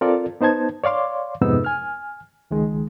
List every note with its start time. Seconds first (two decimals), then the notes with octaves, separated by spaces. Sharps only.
0.01 C4 F4 A4 A#4 D5
0.41 B3 D#4 C5 A5 G#6
0.84 C#5 D5 F5 C6 D6
1.41 F2 G#2 C3 B3 D#4 E6
1.65 G#5 F6
2.51 C#2 D#3 G#3